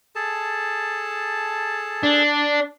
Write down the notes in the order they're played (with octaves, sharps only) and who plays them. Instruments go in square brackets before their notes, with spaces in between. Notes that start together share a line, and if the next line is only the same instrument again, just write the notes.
[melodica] G#4 A4 A5
[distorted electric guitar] D4